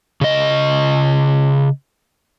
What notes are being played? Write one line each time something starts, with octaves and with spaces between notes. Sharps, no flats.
C#3 D#5